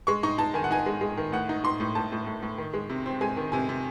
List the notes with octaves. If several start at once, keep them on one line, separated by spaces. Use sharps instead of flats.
G#3 C#6
D#4 C#6
D#4 A5
D#3 G#5
F#5
D#4 G#5
G#3
G#3
D#3
A2 F#5
D#4
D#4 C6
A2
A2 A5
A2
A2
A2
D#3
G#3
C3
C4
G#3 G#5
D#3
C3 G#5
C3